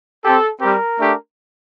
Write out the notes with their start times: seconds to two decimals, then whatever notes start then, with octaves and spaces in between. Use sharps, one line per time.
0.23 C4 G4 A4
0.61 G3 C4 G4 A#4
1.00 A3 D4 G4